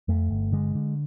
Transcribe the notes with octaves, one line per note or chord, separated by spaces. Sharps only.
F2 A3
G1
D3 G#3
D3